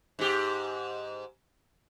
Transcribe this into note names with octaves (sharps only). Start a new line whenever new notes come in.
G#2 G4